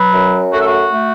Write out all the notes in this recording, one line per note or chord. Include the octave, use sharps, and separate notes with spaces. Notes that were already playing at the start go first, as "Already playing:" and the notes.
Already playing: F#3 B4
F#2
A3 F#4
A4
F#4
A3